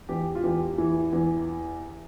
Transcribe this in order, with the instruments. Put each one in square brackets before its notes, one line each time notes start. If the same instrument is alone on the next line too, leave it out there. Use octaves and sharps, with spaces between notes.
[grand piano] E2 G4
F4
E2 G4
E3
E2